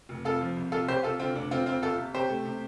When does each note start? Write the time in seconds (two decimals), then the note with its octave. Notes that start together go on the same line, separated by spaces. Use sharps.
0.09 F1
0.25 F2 F4 A4
0.41 F3
0.57 C2
0.72 C2 F4 A4
0.88 C2 G4 C5
1.03 C2 F4 A4
1.19 D3 C4 F4
1.35 F1 D4
1.51 D3 C4 F4
1.66 F2 C4 F4
1.82 G1 F4 A4
1.98 C3
2.14 C3 G4 C5
2.29 A3
2.45 C3